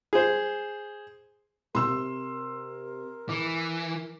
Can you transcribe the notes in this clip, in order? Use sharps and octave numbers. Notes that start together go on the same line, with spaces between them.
G#4 C5
C3 A#4 C6 E6
E3 D6